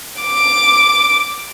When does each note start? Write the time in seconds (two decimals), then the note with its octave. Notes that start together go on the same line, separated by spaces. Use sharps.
0.20 D6